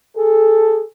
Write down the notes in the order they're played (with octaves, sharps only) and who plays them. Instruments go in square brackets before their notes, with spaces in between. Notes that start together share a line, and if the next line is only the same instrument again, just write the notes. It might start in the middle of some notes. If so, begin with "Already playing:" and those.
[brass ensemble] G#4 A4